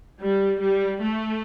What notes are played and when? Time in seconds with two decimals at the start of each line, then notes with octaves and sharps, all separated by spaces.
0.21 G3
0.60 G3
1.01 A3